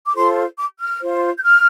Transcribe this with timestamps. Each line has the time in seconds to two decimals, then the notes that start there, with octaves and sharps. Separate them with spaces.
0.06 D6
0.15 F4 A4 C5 C6
0.58 D6
0.79 F6
1.01 F4 C5
1.37 G6
1.43 F6